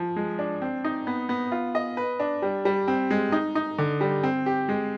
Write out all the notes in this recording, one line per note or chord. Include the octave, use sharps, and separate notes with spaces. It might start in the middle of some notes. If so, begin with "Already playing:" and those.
Already playing: F3
G#3
D4
C4
D#4
B3
B3
F4
D#5
B4
D4
G3
G3
C4
G#3
D#4
D#4
D3
G3
C4
G4
G#3